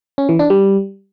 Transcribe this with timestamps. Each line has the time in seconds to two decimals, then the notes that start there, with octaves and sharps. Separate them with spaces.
0.18 C#4
0.29 E3
0.39 D4
0.50 G3